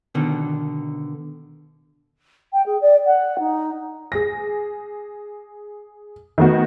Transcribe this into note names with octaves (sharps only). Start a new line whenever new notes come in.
B2 D3 D#3
G5
G#4
D5
F#5
D#4
G#4 A#6
D#3 A3 B3 F#4